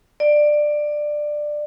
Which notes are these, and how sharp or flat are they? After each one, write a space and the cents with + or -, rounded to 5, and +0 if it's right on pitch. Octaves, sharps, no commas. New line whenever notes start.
D5 +15